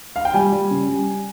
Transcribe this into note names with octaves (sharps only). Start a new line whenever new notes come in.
F5
G5
G3 G#5
G3
C#3
G3